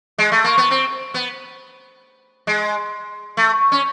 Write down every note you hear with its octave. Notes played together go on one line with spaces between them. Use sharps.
G#3
A3
A#3
B3
C4
B3
G#3
A3
C#4